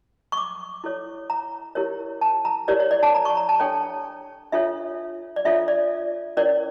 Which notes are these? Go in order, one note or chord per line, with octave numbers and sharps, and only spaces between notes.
C#6
D6
E4 A4 C#5
A#5
E4 G4 A#4 C#5
A5
A#5
E4 G4 A#4 C#5 D5
C#5
D5
A5
A#5
C#6
A#5
A5
D4 A4 C#5 G5
D4 F4 A4 C#5 E5
D5
D4 F4 A4 C#5 E5
D5
C#4 E4 A#4 C#5 D5